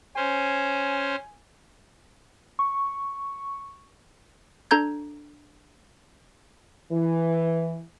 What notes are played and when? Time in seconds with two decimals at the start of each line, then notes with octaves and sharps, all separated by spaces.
0.16 C#4 C5 G#5
2.59 C#6
4.71 D4 A4 A#5 G6 G#6
6.92 E3